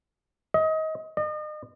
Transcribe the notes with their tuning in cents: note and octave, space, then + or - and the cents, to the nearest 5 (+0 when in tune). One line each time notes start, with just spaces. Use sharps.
D#5 +25
D#5 -40